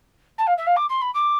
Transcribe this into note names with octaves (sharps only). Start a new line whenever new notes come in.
A5
F5
E5
F5
D6
C6
B5
D6